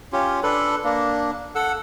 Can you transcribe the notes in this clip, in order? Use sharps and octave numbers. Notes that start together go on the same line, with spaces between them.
C#4 F4 G4
D4 A4 B4
A#3 D4
A4 F#5 E6